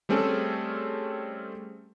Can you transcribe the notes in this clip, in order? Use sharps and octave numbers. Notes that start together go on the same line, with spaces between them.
G3 A3 C4 C#4 G#4 A4